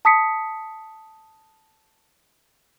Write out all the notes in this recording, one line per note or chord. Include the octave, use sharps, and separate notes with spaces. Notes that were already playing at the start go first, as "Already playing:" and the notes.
A5 D#6 B6 C#7